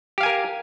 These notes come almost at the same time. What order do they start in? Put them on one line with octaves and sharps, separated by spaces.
G4 F5 G#5 A#4